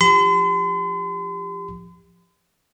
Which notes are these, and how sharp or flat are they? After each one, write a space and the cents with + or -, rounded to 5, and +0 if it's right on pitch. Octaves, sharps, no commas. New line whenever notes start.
F3 +0 G4 +20 C6 -45